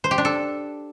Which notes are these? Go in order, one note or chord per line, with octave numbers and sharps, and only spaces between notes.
C5
G4
D4
A4